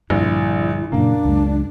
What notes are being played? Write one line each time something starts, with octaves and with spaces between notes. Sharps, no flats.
A#1 G2 D3 E4
F#2 A#2 C#3 A#3 D4
C#2 F#2 G#3